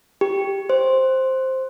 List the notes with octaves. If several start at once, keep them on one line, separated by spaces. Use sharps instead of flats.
G4
C5